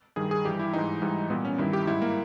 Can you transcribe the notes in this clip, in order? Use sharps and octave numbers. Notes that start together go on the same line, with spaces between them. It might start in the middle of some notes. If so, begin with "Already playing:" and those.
G2 D#3 G3 G#4
G#4
G2 E3 G3 G4
E4
G#2 E3 G3 D#4
G#2 E3 G3
A#2 G3 B3
C#4
G2 D#3 G3 E4
G4
G#2 G3 E4
A#3